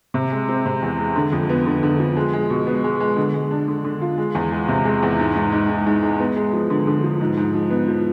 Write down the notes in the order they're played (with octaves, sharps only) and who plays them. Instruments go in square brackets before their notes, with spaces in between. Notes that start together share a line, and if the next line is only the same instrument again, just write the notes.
[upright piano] C3
G#3
C4
C3
E2
G#3
D3
F2
B3
D3
D3
F3
G#3
G#3
B2
B3
G#3
G#3
D3
G#3
D4
D3
D3
F4
G#3
E2
G#3
C3
G#3
E2
G#2
G#2
G#2
G#2
G#2
G#3
B3
G#3
F3
D3
D3
F3
G#2
G#2
F3
B3
F3